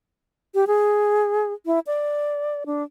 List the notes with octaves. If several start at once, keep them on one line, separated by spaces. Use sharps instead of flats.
G4
G#4
E4
D5
D4